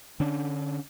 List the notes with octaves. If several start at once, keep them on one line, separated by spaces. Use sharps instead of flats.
D3 C#4 D4